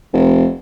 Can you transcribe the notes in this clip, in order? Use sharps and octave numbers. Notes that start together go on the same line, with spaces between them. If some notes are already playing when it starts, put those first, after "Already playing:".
F1